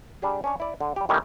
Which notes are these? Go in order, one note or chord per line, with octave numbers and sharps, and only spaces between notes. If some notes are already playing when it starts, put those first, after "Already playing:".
G3 D4 G4 G#4
C#4 D4 C#5
E4 D5
D3
G3 G4
A2 D#3 G3 C#4 D#4 G4